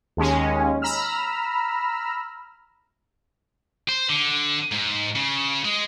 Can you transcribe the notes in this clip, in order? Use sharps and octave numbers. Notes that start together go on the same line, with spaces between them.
D#2 G#3 C#4
A#5 B5 E6 F6
C5
D3
G#2
C#3
G#3